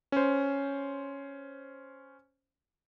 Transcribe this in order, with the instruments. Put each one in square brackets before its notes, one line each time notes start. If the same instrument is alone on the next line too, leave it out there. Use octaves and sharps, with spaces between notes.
[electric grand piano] C#4 C5